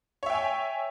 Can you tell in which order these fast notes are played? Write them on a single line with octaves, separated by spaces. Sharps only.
C#5 E5 G5 G#5